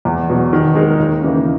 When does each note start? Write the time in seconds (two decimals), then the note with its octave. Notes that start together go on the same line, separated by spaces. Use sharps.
0.05 E2
0.30 B2 F#3
0.53 D#3
0.75 G#3 D#4 A#4
0.99 D#2
1.22 C#3 E3 A#3